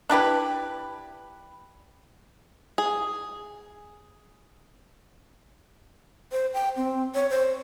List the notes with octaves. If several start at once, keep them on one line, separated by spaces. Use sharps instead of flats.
D4 E4 G4 B4
G#4
C5
G5
C4
C#5
C5